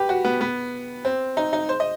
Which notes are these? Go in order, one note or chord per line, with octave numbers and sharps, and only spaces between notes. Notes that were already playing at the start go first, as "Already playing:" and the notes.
Already playing: G4 B4
F#4
B3
B3
C4
D#4
D#4
C5
D#5